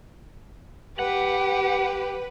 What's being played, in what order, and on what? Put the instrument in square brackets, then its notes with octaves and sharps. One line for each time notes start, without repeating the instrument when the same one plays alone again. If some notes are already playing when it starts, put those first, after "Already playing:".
[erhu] G4 [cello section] B4 [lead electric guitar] F#5